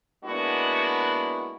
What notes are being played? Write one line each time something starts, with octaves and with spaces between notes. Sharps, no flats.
G#3 A#3 B3 D4 E4 F#4